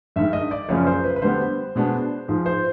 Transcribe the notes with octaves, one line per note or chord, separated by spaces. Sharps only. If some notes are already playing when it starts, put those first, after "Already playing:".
G2 D#3 G#3 E5
D#5
D5
F#2 C#3 F3 A#3 C#4 C#5
C5
B4
B4
D3 G3 B3 C5
B2 G#3 B3 D4
G#2 F3 G#3
C5